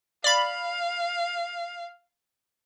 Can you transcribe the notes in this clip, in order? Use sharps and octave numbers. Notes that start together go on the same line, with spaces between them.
D5 F5 B5